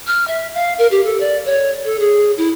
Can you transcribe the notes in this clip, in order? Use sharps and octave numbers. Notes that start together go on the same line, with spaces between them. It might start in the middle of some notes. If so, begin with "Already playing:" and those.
F6
E5
F5
A#4
G4
A4
D5
C#5
A4
G#4
E4